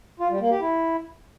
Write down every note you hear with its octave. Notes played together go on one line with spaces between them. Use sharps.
F4
G3
A#3
G4
E4